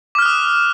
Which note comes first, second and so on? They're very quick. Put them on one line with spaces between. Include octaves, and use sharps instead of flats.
D6 F6 F#6 D#6